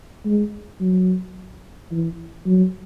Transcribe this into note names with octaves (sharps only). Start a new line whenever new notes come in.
G#3
F#3
E3
F#3